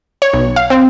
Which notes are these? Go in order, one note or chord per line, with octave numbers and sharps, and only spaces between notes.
C#5
B1
F5
C4